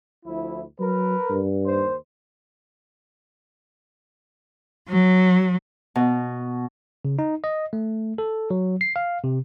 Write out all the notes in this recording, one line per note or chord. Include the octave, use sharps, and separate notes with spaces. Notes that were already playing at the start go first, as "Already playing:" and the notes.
D2 F3 E4
F#3 A#4 B4
G2
D#2 C5
F#3
B2
C#3
D#4
D#5
A3
A4
F#3
C7
F5
C3